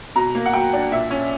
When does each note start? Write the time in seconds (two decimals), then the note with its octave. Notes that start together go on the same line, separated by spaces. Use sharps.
0.16 B2 A#5
0.35 A#3
0.46 F#5
0.53 F#3 G5
0.73 D4
0.92 A#2 E5
1.11 C#4